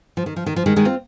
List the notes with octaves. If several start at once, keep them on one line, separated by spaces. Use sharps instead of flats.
F3
D#3
F3
D#3
F3
D#3 G#3
D#3 G#3
C4 F4